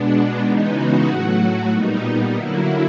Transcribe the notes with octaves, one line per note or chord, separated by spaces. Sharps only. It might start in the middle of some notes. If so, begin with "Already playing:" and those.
Already playing: B2 G#3 B3 D4
C#3 E3 G#3 B3 D#4
F#4
A2 F#3 A3
A#2 G3 B3 D#4
D#4
D3 F#3 A#3 E4